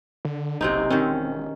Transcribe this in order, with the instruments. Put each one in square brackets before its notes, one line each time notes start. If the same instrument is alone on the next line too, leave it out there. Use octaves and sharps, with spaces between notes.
[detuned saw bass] D3
[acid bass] F#1 [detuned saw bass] B1 [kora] C3 C4 D#4
[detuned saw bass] E1 [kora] D#3 C#4 [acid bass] C4